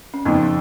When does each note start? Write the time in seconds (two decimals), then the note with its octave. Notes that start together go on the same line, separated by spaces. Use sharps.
0.14 C#4
0.25 F#1 F2 F3 B3 D#4